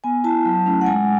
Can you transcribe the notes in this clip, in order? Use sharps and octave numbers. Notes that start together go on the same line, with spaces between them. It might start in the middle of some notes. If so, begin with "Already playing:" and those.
B3 G#5
E4 A5
F#3
A3 C#4 E4
F#5
G#3 G#5